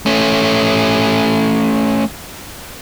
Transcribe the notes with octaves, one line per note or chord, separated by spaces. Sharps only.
A3 C#4